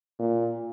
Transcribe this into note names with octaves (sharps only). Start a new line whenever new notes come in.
A#2